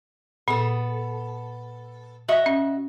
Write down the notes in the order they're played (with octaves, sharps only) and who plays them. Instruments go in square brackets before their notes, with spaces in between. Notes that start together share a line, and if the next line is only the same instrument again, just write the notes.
[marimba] A#2 [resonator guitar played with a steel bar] B3 A4
[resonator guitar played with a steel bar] F#4 D#5 E5
[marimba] C#4